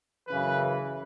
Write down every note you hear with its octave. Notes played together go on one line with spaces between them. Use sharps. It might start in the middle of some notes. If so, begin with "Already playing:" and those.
F#2 C#3 E3 B4